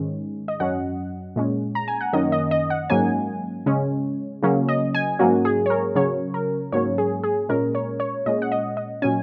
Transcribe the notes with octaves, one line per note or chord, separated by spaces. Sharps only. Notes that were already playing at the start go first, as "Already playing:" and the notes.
Already playing: G#2 D#3 G#3 C#4
D#5
F#2 F#3 C#4 F#5
A#2 G#3 C#4
A#5
G#5
F#5
F#2 D#3 A#3 C#4 D#5
D#5
D#5
F#5
G#2 F#3 A#3 C#4 G#5
C#3 G#3 C#4
C#3 F#3 A#3 C#4
D#5
G#5
G#2 F#3 A#3 C#4 F#4
G#4
C#5
A#4
C#3 F#3 C#4 C#5
A#4
G#2 F#3 A#3 C#4 C#5
G#4
G#4
A#2 G#3 C#4 A#4
C#5
C#5
A#2 G#3 C#4 D#5
F#5
D#5
D#5
A#2 F#3 C#4 G#5